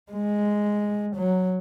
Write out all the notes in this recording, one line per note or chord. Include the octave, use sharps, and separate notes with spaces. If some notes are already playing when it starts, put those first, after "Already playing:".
G#3
F#3